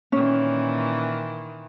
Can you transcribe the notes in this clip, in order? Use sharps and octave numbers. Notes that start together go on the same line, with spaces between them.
A#2 D#3 E3 C#4